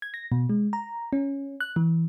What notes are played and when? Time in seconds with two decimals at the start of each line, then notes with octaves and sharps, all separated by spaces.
0.02 G#6
0.14 A#6
0.32 B2
0.49 G#3
0.73 A#5
1.13 C#4
1.61 F#6
1.76 E3